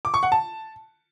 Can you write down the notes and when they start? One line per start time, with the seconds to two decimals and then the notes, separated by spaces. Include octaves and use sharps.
0.05 D6
0.14 C#6
0.23 F#5
0.32 A5